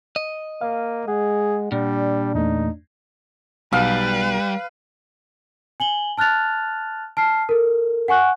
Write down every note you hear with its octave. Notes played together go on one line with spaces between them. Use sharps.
D#5
A#3 F5
G#3 G#4 F#5
A#2 G3 D4
E2 A3 D#4
B1 G3 B4 F5
G#5 F#7 G7
A5 F6 F#6 A6 F7
A5 F6 C7
A4 A#4
F#5 G#5 C#6 F#6